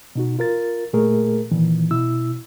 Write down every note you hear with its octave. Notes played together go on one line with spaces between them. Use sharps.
B2 D#4 F#4
F4 A#4 A6
A#2 A3 G#4 A#4
A#2 D#3 E3
B2 E4 E6